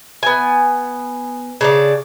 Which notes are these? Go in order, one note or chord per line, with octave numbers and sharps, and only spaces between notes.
B3 G#5
C#3 D4 D5